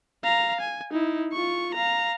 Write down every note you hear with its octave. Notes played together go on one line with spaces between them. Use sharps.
F5 A#5
G#5
D#4 E4
F4 C#6
F5 A#5